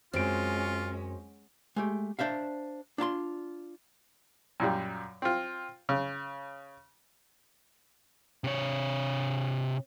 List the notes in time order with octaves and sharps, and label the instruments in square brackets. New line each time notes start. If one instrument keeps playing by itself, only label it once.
[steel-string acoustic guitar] F#2 [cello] G#3 C#4 [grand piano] C4 D7 [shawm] F4
[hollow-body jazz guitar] G#3 A3 G4
D4 C5 E5 F5
D4 F4 A5 C6
[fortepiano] F#2 A#2 G3
C4 F4
C#3
[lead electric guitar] C3 C#5